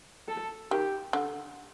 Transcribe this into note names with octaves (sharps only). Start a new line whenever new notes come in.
A4
D#3 G4
D3